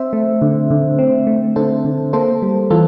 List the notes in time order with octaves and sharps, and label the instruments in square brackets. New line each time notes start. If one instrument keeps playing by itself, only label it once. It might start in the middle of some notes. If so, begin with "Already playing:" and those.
Already playing: [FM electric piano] C4 C5 E5
A3
D3
D3
C4
A3
D3 A4 C5
D3
A#3 A4 C5
G3
E3 F4 A4